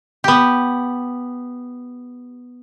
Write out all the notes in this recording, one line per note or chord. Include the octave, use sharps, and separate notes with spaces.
B3 G4